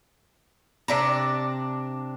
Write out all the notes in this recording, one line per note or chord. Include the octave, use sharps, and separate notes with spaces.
C3 D4 A#5